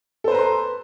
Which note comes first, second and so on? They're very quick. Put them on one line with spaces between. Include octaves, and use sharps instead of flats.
A4 C5 B4 A#5 C6